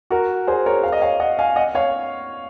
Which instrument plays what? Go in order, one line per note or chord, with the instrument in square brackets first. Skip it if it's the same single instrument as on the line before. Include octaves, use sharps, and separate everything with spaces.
[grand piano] F#4 A#4
G#4 C5
A#4 C#5
F5
D#5
C#5 F5
D#5 F#5
F5 G#5
D#5 F#5
C#5 F5